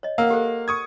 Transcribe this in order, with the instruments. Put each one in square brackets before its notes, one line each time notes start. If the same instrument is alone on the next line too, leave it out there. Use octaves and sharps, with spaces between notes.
[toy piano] C#5 D#5
[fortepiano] A#3 [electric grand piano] F5 [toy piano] F#5 E6
[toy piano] G4 A4 C5
[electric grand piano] C#6 D#6 G#6